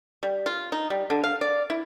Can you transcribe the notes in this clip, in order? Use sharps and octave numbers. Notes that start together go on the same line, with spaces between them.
G3
F4
D#4
G3
D3
F5
D5
E4